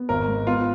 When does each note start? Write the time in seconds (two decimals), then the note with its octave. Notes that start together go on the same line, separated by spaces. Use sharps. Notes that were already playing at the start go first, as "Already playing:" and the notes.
Already playing: B3
0.09 G#1 A#4
0.28 G#2
0.46 B3 F4